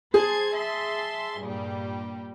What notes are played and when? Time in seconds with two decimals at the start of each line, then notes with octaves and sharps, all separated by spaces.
0.14 G#4 C5 A5 G#6
0.58 E5 A5 C6
1.42 G2 A#2 G3